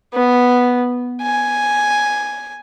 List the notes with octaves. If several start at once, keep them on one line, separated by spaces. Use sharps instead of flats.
B3
G#5